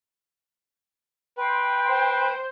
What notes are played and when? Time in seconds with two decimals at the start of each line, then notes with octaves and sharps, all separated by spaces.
1.38 B4 G5 C6
1.89 C5